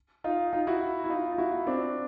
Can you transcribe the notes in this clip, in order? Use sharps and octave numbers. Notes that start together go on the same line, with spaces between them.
D#4 F4
D#4 F4
E4 F#4
E4
D#4 F4
F4
E4 F#4
C4 D4